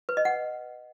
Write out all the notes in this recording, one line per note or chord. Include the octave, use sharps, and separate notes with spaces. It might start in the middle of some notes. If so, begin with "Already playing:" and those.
B4
D#5
F#5